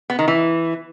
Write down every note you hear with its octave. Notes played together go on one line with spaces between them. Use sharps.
B3
D#3
E3